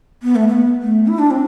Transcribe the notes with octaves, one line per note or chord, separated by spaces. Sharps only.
B3
A3
B3
A3
E4
D4
C4